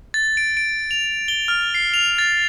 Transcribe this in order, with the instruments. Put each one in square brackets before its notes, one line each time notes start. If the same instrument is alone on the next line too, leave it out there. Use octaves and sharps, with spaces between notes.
[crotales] A6
D7
D7
F7
G7
F6
C7
F7
A6